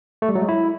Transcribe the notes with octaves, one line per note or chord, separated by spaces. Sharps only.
A3
G3
F#3
G#3
E4